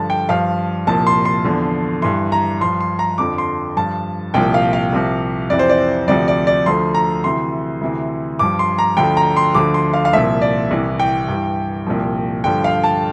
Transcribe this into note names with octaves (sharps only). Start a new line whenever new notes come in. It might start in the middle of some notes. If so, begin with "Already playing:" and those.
Already playing: G2 D3 F3 A5
G5
G2 F3 F5
C2 A#2 F3 A5
C6
C6
E2 D3 F3
G2 E3 C6
A#5
G2 F3 C6
C6
A#5
F2 D3 F3 D6
C6
G2 F3 A5
C2 A#2 F3 G5
F5
F5
C2 C3 F3
F2 C3 E3 D5
C5
D5
D2 C3 F3 D5
D5
D5
D2 D3 F3 C6
A#5
D2 C3 E3 C6
D2 C3 E3
G2 F3 D6
C6
A#5
D2 D3 F3 G5
A#5
C6
D2 D3 F3 D6
C6
F5
F5
C2 A#2 F3 E5
D5
C2 C3 E3
G5
G2 E3
C2 A#2 F3
G2 D3 F3 G5
F5
A5